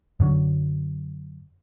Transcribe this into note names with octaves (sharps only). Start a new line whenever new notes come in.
F#2 D3 F#3